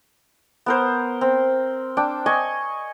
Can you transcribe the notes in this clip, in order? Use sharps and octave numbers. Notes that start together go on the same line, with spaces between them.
B3 A#4 C5
C4
D4 G5
D#5 G#5 C#6